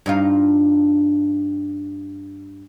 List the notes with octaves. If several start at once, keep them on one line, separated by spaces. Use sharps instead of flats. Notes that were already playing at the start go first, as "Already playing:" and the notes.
G2 D#4 F4